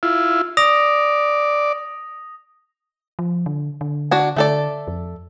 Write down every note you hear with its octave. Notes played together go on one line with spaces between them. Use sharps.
E4 F4
D5 D#6 A#6 F7
F3
D3
D3
D4 F#4 G#5
D3 A3 A4 D5
F2